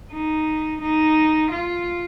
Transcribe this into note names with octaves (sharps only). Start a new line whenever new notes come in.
D#4
D#4
F4